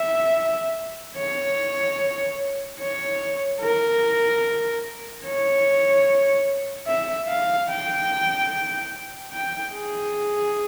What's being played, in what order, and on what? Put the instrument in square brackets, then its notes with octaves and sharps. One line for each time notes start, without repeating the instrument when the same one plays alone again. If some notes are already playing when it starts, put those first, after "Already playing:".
Already playing: [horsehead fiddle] E5
C#5
C#5
A#4
C#5
E5
F5
G5
G5
G#4